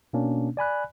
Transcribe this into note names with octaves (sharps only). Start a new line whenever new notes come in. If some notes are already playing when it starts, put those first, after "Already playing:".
B2 A#3 C#4 D4
D5 G#5 B5 F#6